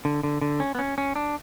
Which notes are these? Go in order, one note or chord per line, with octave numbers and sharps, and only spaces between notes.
D3
D3
D3
C#4
B3
C#4
C#4
D4